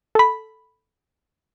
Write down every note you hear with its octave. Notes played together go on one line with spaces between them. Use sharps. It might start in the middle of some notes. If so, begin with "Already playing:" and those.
A4 B5